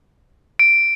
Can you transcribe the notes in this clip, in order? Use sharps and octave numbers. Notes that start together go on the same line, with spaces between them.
D7